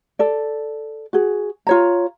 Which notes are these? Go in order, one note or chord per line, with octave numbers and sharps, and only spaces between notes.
A4 D5
F#4 G#4
F4 C#5 A#5